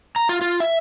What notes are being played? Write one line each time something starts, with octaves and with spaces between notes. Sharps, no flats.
A#5
F4
F4
E5